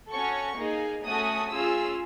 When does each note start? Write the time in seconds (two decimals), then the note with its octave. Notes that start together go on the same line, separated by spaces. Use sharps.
0.10 C#4 F#4 A4 C#6
0.56 A#3 D#4 G#4
1.03 A3 C#4 F#4 A4 D#6
1.49 C#4 F4 G#4 E6